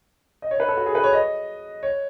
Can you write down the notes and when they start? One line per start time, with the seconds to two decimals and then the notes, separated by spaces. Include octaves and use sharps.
0.42 D#5
0.51 C#5
0.60 B4
0.69 A4
0.77 F#4
0.86 G#4
0.95 B4
1.04 C#5
1.13 D#5
1.83 C#5